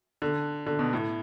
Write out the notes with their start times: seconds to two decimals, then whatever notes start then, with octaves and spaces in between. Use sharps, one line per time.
0.22 D3
0.66 D3
0.79 B2
0.93 A2